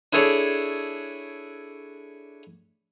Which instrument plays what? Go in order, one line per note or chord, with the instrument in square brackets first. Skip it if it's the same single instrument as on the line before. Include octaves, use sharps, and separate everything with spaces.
[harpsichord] D4 E4 G#4 A4 C#5 D5